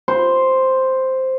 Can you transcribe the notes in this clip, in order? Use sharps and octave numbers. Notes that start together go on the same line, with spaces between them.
C5